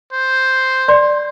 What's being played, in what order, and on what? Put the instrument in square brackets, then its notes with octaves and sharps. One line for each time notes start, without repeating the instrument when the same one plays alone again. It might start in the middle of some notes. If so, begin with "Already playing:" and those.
[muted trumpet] C5
[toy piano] D5 C6